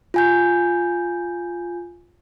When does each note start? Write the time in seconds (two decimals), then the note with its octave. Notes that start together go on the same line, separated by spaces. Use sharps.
0.14 F4 G#5 G6